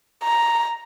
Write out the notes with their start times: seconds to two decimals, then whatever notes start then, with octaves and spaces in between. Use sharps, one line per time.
0.23 A#5